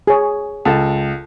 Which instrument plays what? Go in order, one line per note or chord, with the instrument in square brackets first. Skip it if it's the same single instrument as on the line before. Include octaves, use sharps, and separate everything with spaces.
[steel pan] G#4 C#5
[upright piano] C#2 [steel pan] A4 A5